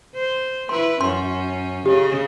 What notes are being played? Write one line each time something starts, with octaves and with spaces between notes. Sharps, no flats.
C5
E4 B4 C6
F#2 C#4 C6
C#3 C#4 G4 D#5